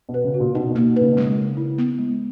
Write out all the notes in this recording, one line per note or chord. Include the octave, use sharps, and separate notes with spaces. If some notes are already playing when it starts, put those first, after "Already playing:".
B2
B4
C#3
F#4
A#2
B2 D#4
B2
A#3
C#3 B4
B2
C#3 G#3
A#4
E4
B3
G#3